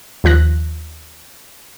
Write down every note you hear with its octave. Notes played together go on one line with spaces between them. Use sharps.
D#2 F3 F#6 A#6